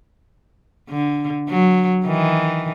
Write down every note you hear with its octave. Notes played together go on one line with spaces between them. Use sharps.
D3
F#3
D#3 E3